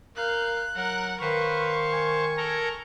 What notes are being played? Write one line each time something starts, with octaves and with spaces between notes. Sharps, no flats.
A#4 F5 F#6 G6
F#3 A#4 F#5
D#3 B4 C5 F5 C#6
G#5
A4 A#4 A#5